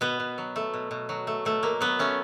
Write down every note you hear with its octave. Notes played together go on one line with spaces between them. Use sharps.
B2 B3
B2
F#3
A3
B2
B2
F#3
A3
B2 A3
B2 A#3
F#3 B3
A3 C#4